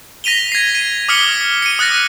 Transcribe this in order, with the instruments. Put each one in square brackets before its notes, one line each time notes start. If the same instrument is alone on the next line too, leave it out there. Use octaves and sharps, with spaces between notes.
[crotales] A#6 B6 D#7 F7 G7
G#6 C7
D#7
D6 D#6 F6 B6 C#7 G7
C#7 D#7
D#6 F#6 A6 A#6